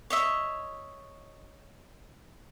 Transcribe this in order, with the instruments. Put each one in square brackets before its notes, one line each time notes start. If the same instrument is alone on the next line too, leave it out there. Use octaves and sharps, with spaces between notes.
[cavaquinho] C#5 D#5 E5